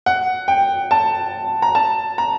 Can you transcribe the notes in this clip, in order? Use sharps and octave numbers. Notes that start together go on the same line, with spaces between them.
F#5
G5
A5
A#5
A5
A#5